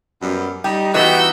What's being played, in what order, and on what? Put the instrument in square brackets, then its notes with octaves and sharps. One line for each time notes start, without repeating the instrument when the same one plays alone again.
[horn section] F#2 G3 B3
[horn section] G3 D#4 [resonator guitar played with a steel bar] G4
[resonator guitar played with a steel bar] E3 B3 D#4 [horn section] F#4 G4 [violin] E6 G6